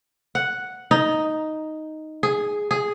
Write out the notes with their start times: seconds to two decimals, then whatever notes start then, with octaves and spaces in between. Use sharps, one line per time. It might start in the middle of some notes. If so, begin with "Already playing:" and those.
0.35 F#5
0.91 D#4
2.23 G#4
2.71 G#4